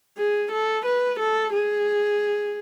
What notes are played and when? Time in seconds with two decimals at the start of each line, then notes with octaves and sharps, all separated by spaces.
0.18 G#4
0.52 A4
0.86 B4
1.20 A4
1.53 G#4